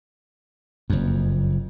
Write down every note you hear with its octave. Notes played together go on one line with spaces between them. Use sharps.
F#1 F2